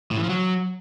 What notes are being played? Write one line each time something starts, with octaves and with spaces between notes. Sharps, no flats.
A2
E3
F3
F#3